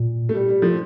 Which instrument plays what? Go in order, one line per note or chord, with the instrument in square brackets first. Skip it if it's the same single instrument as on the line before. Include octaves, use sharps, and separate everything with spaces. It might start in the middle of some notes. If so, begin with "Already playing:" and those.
Already playing: [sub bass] A#2
[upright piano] A3
G3
G3
F3 A3